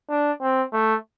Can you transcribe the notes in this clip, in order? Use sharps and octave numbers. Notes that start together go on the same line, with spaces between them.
D4
C4
A3